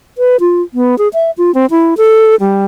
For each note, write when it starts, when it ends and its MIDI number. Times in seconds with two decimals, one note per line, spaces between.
0.18 0.37 71
0.40 0.62 65
0.74 0.98 59
0.98 1.08 68
1.13 1.31 76
1.38 1.54 65
1.54 1.66 60
1.71 1.94 64
1.97 2.35 69
2.40 2.66 55